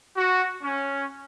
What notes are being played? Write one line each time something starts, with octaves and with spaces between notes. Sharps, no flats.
F#4
C#4